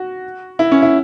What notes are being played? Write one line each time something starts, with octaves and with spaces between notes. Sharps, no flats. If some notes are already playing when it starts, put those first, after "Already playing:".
Already playing: F#4
E4
C#4
E4